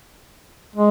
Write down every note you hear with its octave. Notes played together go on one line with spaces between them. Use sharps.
G#3